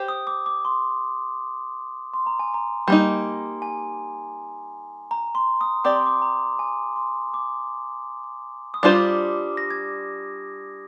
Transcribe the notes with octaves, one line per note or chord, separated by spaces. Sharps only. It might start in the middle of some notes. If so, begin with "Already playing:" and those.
Already playing: G4 C5
D#6
D6
D6
C6
C6
A#5
G#5
A#5
G3 A#3 D#4
G#5
A#5
C6
D#6
C4 G4 D5 D6
C6
D6
A#5
G#5
C6
D6
D#6
G3 D4 F4 C5 D6
A#6
G#6